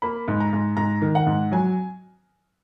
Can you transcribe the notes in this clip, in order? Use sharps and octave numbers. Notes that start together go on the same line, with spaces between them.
A#3 B5
G#2
A#5
G#2
G#2 A#5
D#3
F#5
G#2
F#3 G#5